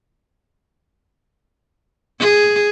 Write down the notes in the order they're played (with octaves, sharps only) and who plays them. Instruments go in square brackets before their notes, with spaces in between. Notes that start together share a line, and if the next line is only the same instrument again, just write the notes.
[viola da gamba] G#4